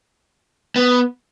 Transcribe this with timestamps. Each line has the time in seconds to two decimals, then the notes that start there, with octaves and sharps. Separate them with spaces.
0.76 B3